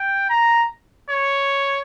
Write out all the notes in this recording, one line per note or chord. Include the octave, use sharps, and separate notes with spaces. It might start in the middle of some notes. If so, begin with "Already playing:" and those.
Already playing: G5
A#5
C#5